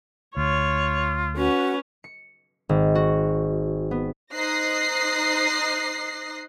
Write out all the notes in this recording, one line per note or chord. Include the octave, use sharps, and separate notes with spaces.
D2 F4 C#5
C#4 F#4 B4
C#7
G#1
F#4
B3
D#4 C5 D#6 F#6 A#6 C7